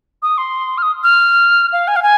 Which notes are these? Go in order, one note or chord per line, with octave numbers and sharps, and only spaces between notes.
D#6
C6
F6
D#6
F6
F5
G#5
F5
G#5